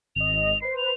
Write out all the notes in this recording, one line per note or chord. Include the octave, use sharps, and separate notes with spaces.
G#1 D#5 F7
B4 C5 C7
F7